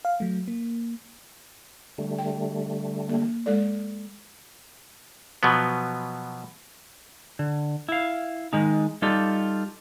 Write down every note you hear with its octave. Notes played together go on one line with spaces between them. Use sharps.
F5
F#3 A3
A#3
D3 G3 A3
G5
A#3
G#3 A4 D5
B2 F3 F#3 B3
D3
E4 F5
D#3 G#3 D#4
G3 D#4 F4 G4 A4